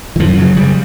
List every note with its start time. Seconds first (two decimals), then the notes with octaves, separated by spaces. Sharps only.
0.16 E3
0.19 F#2 F3
0.38 C#3 F#3
0.56 C#3 G3